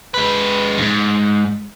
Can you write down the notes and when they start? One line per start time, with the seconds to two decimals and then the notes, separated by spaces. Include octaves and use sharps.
0.14 G#3 B4
0.78 F2 G#2